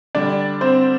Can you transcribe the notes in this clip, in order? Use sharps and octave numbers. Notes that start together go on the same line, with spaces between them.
D3 G3 D4 D5
C4 C5